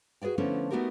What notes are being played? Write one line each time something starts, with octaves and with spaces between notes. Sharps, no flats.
F#4 G#4 B4 D5 G5
D3 F3 A3 B3 C#4 E4
A3 B3 D#4 F#4 G4 A#4